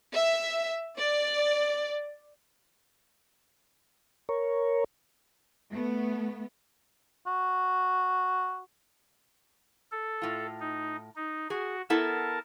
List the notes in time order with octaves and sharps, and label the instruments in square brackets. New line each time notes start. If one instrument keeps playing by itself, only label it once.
[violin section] E5
D5
[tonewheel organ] A#4 C#5
[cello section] A3 B3
[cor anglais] F#4
[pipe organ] A4
[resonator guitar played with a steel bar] A2 F4
[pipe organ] D#4
D#4
[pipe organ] F#4 [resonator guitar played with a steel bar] G#4
[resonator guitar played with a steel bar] B3 E4 A4 [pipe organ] A#4 A5